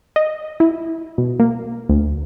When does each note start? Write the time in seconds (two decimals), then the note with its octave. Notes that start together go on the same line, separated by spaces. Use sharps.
0.16 D#5
0.60 E4
1.18 B2
1.40 A#3
1.89 D2